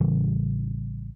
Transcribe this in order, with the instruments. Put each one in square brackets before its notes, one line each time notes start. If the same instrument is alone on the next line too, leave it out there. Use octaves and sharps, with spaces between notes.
[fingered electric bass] A1 C#3 E3 G3